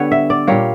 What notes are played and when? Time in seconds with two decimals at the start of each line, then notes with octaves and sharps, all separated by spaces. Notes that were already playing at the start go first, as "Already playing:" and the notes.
Already playing: D3 G3 B3 C#5
0.12 E5
0.30 D5
0.47 A#2 G3 A#3 C#5